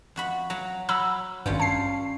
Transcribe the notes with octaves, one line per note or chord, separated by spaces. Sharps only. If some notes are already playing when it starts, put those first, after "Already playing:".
F2 F#4 B5
F#3 A#5
F#3 A#5 B5 E6
G#1 G2 G3 C#4 F4
C#5 A5 C7